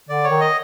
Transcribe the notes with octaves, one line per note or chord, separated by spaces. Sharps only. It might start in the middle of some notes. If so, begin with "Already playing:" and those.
D3 D5
C#5
D#3
D#5